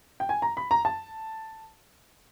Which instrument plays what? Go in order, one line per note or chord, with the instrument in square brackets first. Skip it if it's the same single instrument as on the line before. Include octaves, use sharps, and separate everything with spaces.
[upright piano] G5
G#5
A#5
B5
A#5
A5